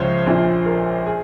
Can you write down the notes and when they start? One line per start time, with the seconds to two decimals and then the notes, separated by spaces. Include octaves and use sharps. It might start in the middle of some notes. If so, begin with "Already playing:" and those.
Already playing: C#2 C#3 F3 C5 C#5 E5
0.26 A#1 A#2 F3
0.66 A#4
1.06 G#4